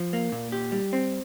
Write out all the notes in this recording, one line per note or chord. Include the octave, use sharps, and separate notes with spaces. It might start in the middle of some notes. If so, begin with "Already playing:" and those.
Already playing: F3
A#3
A#2
G4
G3
C4